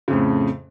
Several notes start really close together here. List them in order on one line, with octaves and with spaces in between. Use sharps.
C#3 F2 A2